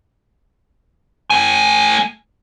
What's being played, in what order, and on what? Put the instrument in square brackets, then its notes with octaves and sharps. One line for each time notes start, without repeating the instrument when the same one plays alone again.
[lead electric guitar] A3 G#5